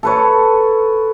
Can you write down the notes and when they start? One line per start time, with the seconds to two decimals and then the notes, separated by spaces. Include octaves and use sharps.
0.03 A4 B4 C#5